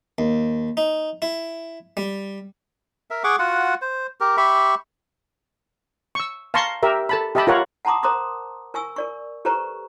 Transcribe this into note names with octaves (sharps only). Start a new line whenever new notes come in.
D#2
D#4
E4
G3
A#4 E5
G#4 F#5 C#6 D6
F4 F#4 F#5
C5
G4 A#4
G4 E5 B5 C#6
C#6 E6
F5 A5 A#5 C6 C#6
G4 A#4 E5
A4 A5 B5
G4 D#5 E5 A5 B5
F4 A#4 C#5 F#5
F#5 A5 A#5 C6 D6 D#6
A#4 C5 A#5 C6 D6 D#6
A#4 G#5 C#6 E6
A#4 D5 C#6
G4 A4 B4 C5 A#5 C#6